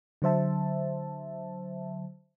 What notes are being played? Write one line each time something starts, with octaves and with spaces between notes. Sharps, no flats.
D3 F#3 C5 E5 A5